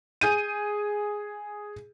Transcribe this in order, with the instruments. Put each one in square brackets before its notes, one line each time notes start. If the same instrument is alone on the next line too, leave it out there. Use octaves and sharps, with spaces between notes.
[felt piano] G#4 G6 D#7